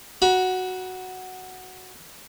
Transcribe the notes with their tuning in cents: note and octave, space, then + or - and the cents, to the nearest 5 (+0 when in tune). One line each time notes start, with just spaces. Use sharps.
F#4 +0 B5 -45